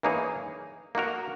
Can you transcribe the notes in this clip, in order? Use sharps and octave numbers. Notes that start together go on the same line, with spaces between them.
E3 A#3 D#4 G#4 C#5
A#3 D#4 F#4 A#4